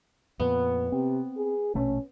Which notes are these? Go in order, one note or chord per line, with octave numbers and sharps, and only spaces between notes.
F2 A#2 B3
C3 C4
G#4
A#1 B2 A3 C#4